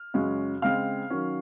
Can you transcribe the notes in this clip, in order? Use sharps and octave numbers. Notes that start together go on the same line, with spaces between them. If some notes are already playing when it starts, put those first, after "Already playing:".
Already playing: F6
F#2 C#3 G#3 C#4
C#3 G#3 C4 F5 F6
D#3 F#3 C#4